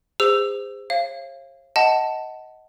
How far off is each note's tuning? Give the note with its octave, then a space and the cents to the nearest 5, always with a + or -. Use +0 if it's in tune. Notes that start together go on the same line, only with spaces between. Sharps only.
G#4 -35 C5 -20 E6 +15
C#5 -45 F5 -25
D#5 +20 F#5 +10 A5 +0